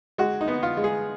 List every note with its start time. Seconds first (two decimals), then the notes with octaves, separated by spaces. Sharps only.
0.18 G#3 F#4
0.41 D#4
0.48 B3
0.63 F4
0.77 G#3
0.84 G#4